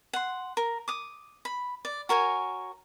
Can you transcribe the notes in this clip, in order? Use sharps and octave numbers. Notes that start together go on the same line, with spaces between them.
F#5 C6
A#4
D6 D#6
B5
D5
F#4 A#4 C#5 G#5